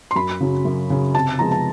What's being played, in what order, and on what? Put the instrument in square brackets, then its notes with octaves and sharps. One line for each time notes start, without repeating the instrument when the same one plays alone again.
[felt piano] C6
F#2 B5
C#3 F#3
F#2
C#3 F#3
C3 A5
F3 G#3 B3 A#5
A5